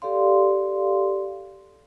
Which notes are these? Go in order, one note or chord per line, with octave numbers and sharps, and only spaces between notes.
G4 A4 D5 F5 C6